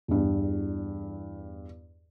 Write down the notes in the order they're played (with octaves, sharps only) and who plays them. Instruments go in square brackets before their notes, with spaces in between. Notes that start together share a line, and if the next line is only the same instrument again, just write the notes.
[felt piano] E2 G2